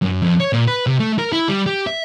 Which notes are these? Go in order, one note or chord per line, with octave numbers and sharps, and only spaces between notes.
F#2
F2
C#5
A#2
B4
C3
A3
A#4
E4
G3
G4
E5